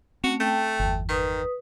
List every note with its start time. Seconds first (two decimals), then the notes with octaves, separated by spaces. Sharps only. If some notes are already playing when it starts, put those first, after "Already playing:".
0.24 A3 C4 C#4 F#4
0.40 A3 G5 A5
0.79 G1 E2
1.09 D#3 B4 D#6